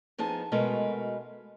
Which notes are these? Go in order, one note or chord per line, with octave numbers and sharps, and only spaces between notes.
F3 B3 D#4 G#4 A5
B2 G#3 A3 F#4 A#4 B4